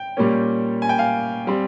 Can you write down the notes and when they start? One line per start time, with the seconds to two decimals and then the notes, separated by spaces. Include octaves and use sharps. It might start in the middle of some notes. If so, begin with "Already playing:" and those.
Already playing: G5
0.17 A#2 G3 A#3 C#4
0.82 G#5
0.89 G5
0.98 F5 G#5
1.47 G3 C4